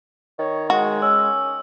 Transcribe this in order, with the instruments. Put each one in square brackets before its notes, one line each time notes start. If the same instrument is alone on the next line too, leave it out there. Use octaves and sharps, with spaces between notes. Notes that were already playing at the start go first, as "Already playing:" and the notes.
[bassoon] D#3 [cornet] C#5
[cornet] G#3 [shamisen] F#4
[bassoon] C#4 [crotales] E6